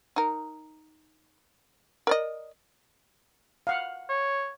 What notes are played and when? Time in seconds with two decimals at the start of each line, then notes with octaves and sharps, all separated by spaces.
0.16 D#4 A#4
2.07 A#4 D5 D#5
3.67 F5 F#5
4.09 C#5